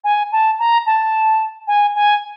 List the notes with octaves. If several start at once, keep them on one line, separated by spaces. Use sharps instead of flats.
G#5
A5
A#5
A5
G#5
G#5